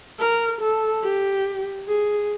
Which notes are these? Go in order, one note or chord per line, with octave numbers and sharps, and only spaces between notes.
A#4
A4
G4
G#4